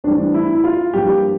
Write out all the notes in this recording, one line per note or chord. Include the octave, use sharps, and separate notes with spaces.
G2 E3 A3 C4 D4
E4
E4
F4
G2 F3 A#3 G4